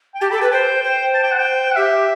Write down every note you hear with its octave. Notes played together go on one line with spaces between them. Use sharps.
G5
G4 A5
A4 B5
G5
B4 A5
C5 G5
C5
A5
G5
F#5
G5
F#5
G4 E5